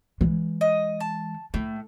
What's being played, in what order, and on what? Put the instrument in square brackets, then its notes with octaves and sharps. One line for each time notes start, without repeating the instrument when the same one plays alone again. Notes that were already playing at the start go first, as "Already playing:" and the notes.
[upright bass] E3 G#3
[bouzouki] D#5
A5
[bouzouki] A2 [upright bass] A3